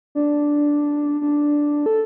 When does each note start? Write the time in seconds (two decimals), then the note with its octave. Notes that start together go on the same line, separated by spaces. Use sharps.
0.15 D4
1.21 D4
1.86 A4